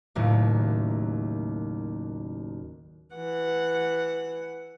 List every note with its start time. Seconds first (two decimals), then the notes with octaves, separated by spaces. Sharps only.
0.15 F#1 D#2 A2
3.15 E3 F#5